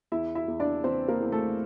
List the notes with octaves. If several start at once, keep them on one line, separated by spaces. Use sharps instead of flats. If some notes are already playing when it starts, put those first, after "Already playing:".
E2 E4 E5
E4 E5
E2
D4 D5
E3 C4 C5
A#3 A#4
E2
A3 A4